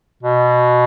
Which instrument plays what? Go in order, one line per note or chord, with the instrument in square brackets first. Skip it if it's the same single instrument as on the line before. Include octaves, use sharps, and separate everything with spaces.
[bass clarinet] B2